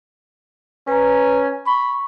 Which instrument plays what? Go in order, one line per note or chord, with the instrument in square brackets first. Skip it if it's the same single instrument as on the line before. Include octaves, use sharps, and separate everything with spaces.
[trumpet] C#4 [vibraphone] B4 A#5
[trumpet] B5 [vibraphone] C#6